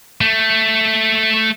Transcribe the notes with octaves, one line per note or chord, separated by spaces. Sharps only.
A3